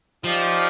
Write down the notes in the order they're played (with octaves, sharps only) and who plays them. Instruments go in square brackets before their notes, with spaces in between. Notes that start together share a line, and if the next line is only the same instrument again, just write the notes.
[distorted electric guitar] F3 [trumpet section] D#4 G4 D5 F5